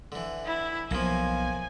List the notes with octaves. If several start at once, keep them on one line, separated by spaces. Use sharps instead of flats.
D3 E3
E4
B1 B2 F3 A#3 G#5